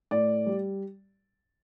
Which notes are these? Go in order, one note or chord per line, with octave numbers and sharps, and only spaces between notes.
A2 D5
G3